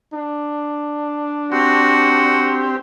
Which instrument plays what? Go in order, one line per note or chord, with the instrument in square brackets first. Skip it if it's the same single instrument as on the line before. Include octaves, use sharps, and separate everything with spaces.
[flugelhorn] D4
[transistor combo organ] C4 G4 [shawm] F#4